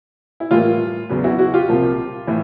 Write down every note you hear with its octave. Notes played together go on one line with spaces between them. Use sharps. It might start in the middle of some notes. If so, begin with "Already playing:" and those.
E4
A2 E3 G3 A#3 F4
E2 C#3 F#3 B3
E4 F#4
E4 F#4
F4 G4
C2 C3 F3 A#3
A2 E3